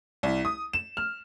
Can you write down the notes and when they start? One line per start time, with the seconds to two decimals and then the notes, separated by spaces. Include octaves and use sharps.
0.23 C2
0.45 D#6
0.73 E7
0.97 F6